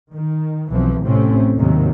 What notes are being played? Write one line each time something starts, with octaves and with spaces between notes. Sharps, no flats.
D#3
B1 E3 F3 C4
A1 A2 C3 A3 C4 C#4
D#2 G#2 C3 D#3 F#3